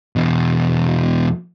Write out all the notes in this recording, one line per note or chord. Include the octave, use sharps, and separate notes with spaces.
E2 B2